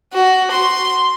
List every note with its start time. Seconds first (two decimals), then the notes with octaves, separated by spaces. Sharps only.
0.14 F#4
0.51 C6